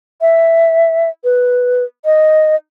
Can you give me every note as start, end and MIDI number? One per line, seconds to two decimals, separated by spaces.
0.21 1.09 76
1.24 1.83 71
2.05 2.55 75